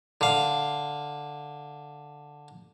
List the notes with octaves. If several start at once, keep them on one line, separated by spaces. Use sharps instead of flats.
D3 F5